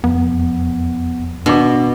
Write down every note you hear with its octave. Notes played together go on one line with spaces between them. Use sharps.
E1 F2 B3
B2 D4 D6